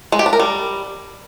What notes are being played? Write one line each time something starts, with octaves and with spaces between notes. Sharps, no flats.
G#3
G4
D4
A#4
G3